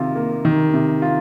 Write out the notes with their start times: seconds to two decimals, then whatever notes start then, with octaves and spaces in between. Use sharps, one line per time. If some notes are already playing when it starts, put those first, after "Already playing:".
Already playing: C3 D#3 F4
0.15 A#3
0.45 D#3
0.73 C3
1.02 F4